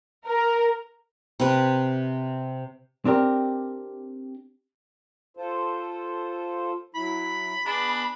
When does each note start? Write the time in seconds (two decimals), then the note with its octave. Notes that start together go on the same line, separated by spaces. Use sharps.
0.25 A#4
1.40 C3 B4
3.05 C4 D4 G4 A#4
5.37 F4 A4 C5
6.95 F#3 E4 B5
7.66 B3 D4 G#4 B5